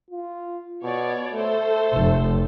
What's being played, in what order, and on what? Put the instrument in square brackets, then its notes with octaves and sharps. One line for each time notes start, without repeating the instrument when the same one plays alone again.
[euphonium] F4
[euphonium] B2 [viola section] C#5 D5
[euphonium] A3 [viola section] A4 C5
[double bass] F1